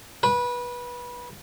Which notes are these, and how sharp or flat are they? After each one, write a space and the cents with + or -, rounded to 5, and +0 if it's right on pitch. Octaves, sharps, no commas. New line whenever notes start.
B4 -20